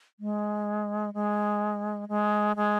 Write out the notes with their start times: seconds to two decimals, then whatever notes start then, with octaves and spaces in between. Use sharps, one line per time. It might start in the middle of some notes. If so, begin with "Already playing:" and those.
0.20 G#3
1.14 G#3
2.09 G#3
2.56 G#3